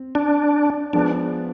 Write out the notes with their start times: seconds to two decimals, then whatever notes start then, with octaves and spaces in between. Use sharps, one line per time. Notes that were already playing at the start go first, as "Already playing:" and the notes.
Already playing: C4
0.15 D4
0.93 F3 G#3 B3 D4